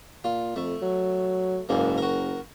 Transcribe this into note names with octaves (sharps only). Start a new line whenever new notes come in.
A#2 F4
F2 A3
F#3
F#1 C#2 G#2 A#3
F#4 A#4